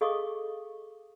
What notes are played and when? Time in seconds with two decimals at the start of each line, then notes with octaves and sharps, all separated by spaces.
0.01 G#4 A4 D#5 F5 C#6 D#6